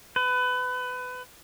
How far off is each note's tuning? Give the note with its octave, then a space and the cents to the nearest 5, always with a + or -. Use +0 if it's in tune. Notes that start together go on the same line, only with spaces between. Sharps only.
B4 +25